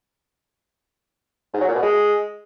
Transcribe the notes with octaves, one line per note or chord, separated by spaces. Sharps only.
G#2
F#3
A#2
B2
G#3